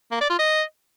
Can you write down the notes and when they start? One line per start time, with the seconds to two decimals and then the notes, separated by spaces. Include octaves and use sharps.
0.12 A#3
0.21 D5
0.30 F4
0.39 D#5